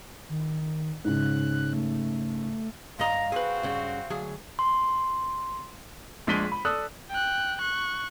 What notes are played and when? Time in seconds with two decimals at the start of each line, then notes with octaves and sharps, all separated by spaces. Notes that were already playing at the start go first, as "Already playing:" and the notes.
0.29 D#3
1.05 G#2 C#3 F#6
1.73 A3
2.99 G2 D#5 F5 A#5
3.32 C4 F#4 G#4 B4
3.63 G2 C#3
4.10 D2 F#3 G#4
4.59 C6
6.27 A#1 G#3 D4 B6 D#7 G7
6.52 B5
6.65 A4 D5 D#6 E6 F#6
7.11 G5 F#6
7.59 C#6 F#6